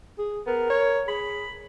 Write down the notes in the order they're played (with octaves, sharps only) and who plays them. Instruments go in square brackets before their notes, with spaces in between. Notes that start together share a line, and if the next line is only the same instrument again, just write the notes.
[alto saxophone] G#4
[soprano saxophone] B3 [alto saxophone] A#4
[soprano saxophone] C#5
[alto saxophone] G#4 [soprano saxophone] B5